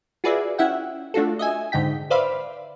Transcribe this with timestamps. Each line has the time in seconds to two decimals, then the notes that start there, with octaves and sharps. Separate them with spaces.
0.24 F4 F#4 G#4 B4 D5 E5
0.58 C#4 E4 E5 F#5 G5
1.14 A3 D4 F4 F#4 A4
1.39 D#5 E5 G#5
1.72 G#2 D3 D#4 G5 B6
2.10 B4 C5 D5 E5 F5 B5